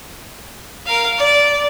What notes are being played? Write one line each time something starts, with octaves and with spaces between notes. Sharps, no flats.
A#4 F5
D5